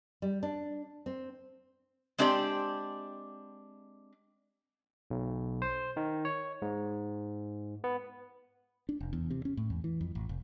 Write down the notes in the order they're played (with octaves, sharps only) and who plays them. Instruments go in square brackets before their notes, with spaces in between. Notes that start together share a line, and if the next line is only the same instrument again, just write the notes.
[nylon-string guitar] G3
D4
C4
[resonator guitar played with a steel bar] G#3 C4 D4 G4 D5
[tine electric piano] B1
C5
D#3
C#5
G#2
B3
[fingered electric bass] D4
F1
E2
C3
C#4
A2
E2
E3
F2
A1
F1